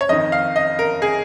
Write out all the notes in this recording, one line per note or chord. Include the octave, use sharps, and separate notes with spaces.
C#5
F2 D#3 D#5
F5
D#5
A#4
G#4